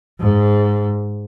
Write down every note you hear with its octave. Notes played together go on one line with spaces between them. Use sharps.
G#2